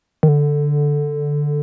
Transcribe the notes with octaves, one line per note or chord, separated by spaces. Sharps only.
D#3
D3